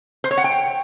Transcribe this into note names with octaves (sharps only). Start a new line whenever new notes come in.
C5
C#5
F#5
G5